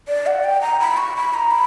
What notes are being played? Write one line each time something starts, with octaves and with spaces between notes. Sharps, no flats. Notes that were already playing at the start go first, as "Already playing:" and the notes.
D5
F#5
G5
A#5
B5
C#6
B5
A#5
B5